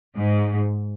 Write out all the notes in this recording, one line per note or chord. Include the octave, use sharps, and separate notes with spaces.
G#2